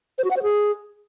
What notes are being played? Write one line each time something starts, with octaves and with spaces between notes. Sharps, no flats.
C5
F#4
F#5
C5
G#4